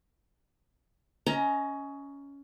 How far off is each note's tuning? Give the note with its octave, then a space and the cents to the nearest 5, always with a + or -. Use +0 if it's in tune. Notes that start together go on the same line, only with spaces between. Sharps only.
C#4 +15 D#5 +25 A#5 +0